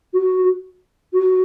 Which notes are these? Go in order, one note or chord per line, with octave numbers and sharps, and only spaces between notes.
F#4
F#4